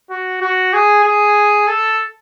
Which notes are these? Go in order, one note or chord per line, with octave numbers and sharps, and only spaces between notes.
F#4
F#4
G#4
G#4
A4